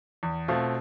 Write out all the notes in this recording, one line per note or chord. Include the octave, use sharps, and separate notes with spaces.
E2
B2 A3 C4 F4